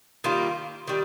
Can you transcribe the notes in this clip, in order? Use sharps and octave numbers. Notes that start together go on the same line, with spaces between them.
D#3 G3 A#3 F4
D#3 G3